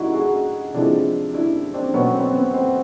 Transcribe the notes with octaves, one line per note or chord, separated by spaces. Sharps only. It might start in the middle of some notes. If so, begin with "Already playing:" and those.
Already playing: D3 G3 D#4 E4 F#4
F#4 G#4
C3 F3 G#3 D4 E4
D4 E4
C4 D4
B2 F#3 B3 C#4
C4
B3
C4